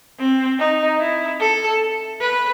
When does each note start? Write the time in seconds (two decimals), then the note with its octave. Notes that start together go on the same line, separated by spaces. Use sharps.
0.19 C4
0.60 D#4
1.00 E4
1.40 A4
2.21 B4